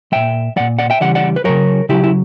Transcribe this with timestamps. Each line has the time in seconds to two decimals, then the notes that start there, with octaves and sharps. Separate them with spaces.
0.12 A#2 F#3 E5 G5
0.56 A#2 F#3 D5 F#5
0.79 D5 F#5
0.90 E5 G5
1.01 C#3 E3 G3 D5 F#5
1.15 D5 F#5
1.36 B4
1.45 C#3 F#3 A#4 C#5
1.89 C#3 F#3 E4 G4
2.04 E4